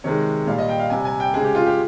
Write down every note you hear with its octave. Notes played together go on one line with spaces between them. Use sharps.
C3 D#3 G#3 C#5
A#2 G3 F5
D#5
G5
F5
C3 G3 G#5
G#5
G5
C#3 G#3 G#4
G4
F4
G4